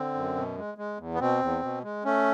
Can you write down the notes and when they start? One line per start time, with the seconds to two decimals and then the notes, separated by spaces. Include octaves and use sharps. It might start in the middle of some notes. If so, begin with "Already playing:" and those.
Already playing: D3 C4
0.14 F#2
0.36 B2
0.57 G#3
0.78 G#3
0.98 E2
1.14 B3
1.20 B2 C4
1.41 E2
1.62 B2
1.83 G#3
2.04 A3 C#4